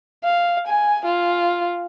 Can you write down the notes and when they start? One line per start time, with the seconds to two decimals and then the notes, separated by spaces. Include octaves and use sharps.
0.24 F5
0.67 G#5
1.05 F4